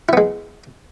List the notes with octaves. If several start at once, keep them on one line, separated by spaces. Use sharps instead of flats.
G#3 B3 E4